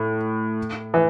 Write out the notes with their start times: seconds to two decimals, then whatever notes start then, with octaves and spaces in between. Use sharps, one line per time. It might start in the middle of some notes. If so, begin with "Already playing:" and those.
Already playing: A2
0.94 E3